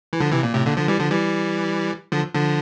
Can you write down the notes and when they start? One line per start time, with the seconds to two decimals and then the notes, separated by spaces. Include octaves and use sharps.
0.13 E3
0.21 D3 F3
0.32 C3 E3
0.43 A#2
0.54 A2 C3
0.66 A#2 D3
0.77 D3 F3
0.88 E3 G3
1.00 D3 F3
1.11 E3 G3
2.12 D3 F3
2.35 D3 F3